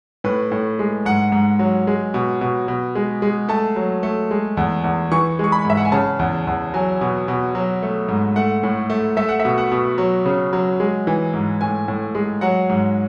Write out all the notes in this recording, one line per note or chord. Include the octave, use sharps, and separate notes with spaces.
A2 B4
A2
G#3
G#2 F#5
G#2
F#3
G#3
B2
B2
B2
G#3
G#3
A3 A5
F#3
A3
G#3
E2
E2
E3 C#6
G#3 C#6
B5
G#2 E5
F#5
G#5
C#3 A5
E2
E2
F#3 G#5
B2
B2
F#3
A3
G#2
A3 F#5
A2
A3
A3 E5
F#5
E5
B2
F#5
B2
F#3
C#3
F#3
G#3
E3
G#2
A2 G#5
A2
G#3
F#3 F#5
G#2